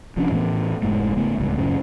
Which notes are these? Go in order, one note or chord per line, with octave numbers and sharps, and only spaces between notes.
F1 F2 C#4 D4
A2 E3 A3 B3
F1 G#2 A3
C#3 A3 B3
D1 C#2 G2
F#2 A2 C#3